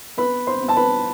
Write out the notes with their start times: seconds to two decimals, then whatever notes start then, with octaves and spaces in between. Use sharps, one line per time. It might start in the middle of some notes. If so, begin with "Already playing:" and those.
0.17 B3 B4 B5
0.47 C5 C6
0.62 B3
0.68 A5
0.77 B4 B5